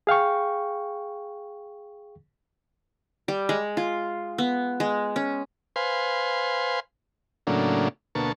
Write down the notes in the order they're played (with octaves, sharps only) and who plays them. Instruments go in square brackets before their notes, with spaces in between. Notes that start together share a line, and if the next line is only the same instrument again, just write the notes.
[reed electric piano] G#4 F5 G5 C#6
[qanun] G3
G#3
F4
B3
G#3
C#4
[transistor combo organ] B4 C5 F5 G#5 C6
A2 C#3 F#3 A#3 D4
D2 B2 A#3 A5 C#6